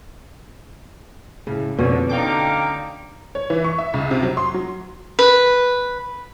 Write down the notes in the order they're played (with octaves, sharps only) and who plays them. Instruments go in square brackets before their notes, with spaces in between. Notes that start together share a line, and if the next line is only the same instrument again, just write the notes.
[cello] A2 [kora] C#3
[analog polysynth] F2 [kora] B2 C#4 [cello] D3
[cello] D3 D#4 [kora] A3 [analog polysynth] F5 G5 D6
[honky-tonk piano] C#5
E3
C#6
E5
C#2
C3
F#3
C6
F#3
[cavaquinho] B4